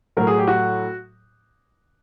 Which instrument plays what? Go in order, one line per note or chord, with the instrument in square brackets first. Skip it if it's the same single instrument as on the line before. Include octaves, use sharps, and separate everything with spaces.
[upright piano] A2 F#3 A#4
G#4
G4
F#4